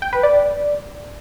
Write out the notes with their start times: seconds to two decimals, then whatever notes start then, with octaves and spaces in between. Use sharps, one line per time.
0.02 G5
0.13 B4
0.23 D5